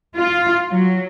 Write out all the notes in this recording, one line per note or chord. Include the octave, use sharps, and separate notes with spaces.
F4
F#3